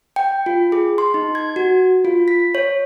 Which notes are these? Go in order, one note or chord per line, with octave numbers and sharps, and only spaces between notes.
G5
F4
G#4
C6
D#4
G#6
F#4
F4
B6
C#5